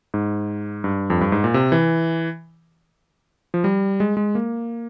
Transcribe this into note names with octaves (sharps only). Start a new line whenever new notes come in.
G#2
G2
F2
G2
G#2
A#2
C3
E3
F3
G3
G#3
G#3
A#3